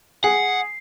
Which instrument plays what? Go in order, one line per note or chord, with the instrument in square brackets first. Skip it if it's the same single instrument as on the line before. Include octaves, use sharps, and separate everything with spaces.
[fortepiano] G#4 [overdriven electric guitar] F#5 [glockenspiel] C7